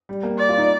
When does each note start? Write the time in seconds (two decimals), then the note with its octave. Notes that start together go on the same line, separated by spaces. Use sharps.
0.09 G3
0.23 A#3
0.38 D5
0.49 F4
0.58 D#4